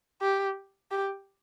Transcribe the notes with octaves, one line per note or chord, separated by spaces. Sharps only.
G4
G4